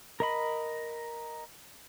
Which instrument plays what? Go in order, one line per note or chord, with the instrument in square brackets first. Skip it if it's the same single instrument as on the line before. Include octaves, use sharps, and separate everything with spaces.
[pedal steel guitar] A#4 D#5 B5